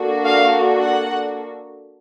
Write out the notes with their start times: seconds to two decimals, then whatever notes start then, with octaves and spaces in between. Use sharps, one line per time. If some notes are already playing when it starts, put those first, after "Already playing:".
Already playing: A#3 D4 F#4 A4
0.25 F5
0.79 F#5